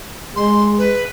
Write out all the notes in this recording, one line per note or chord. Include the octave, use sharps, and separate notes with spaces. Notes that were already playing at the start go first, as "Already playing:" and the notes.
G#3 C6
B4